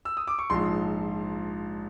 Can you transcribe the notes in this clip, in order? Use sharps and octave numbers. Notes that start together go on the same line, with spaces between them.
E6
D#6
D6
C#6
A#1 G#2 F3 C6